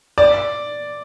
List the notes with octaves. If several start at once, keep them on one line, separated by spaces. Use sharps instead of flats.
D5